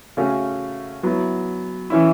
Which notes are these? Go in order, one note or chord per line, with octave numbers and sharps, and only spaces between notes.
C#3 A3 C#4 F#4
F#3 B3 E4
E3 C#4 E4